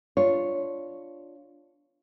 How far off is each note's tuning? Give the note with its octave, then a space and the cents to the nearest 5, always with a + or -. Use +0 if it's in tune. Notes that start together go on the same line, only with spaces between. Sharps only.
D4 -5 F4 +0 C#5 +0